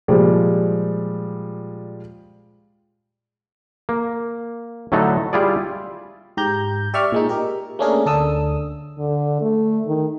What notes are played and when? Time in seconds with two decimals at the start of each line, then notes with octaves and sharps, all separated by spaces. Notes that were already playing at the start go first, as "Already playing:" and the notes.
0.08 A#2 F3 G3 G#3
3.89 A#3
4.92 A2 D3 F#3 A3 D#4 A4
5.33 G3 E4 F4 G#4 D5
6.37 G#2 G4 A#5 G6
6.94 G4 D5 E5 C#6 F6
7.12 A#2 G#3 D#4
7.29 G4 A#4
7.79 A3 A#3 C#4 D4 G#4 A#4
8.06 D2 D4 A4 D#6 E6
8.99 D3
9.41 A3
9.86 D#3